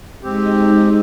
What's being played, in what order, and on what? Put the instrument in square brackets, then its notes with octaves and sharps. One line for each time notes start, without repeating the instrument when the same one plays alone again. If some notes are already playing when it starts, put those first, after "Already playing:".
[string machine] G#3 D#4 [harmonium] C4 G4